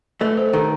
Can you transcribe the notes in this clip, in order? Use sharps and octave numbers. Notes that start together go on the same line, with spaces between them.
A3 B4 D#5
A4 C5
A4
D#3 G4 B4